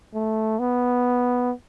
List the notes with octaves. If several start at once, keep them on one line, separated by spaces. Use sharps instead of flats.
A3
B3